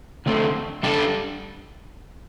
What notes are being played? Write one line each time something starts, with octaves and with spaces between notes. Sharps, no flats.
D3 A3 C4
G3 D4 A4